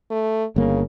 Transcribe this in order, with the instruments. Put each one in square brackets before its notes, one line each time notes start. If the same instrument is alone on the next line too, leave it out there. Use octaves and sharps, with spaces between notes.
[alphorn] A3
[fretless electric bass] G1 A#3 [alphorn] C#3